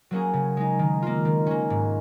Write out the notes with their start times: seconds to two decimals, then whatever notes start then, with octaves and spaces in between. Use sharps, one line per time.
0.11 F#3 A#3 C#4 G#4
0.34 C#3
0.57 G#3 D#4
0.79 D#3
1.03 A#3 F4
1.25 D#3
1.47 A#3 C#4
1.70 G#2